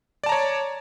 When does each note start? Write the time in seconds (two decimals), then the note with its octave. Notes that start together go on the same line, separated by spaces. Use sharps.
0.24 D5
0.26 A5
0.29 A#5
0.32 C#5